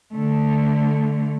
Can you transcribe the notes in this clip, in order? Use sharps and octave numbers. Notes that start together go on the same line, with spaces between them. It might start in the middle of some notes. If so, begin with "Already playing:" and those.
D3 A3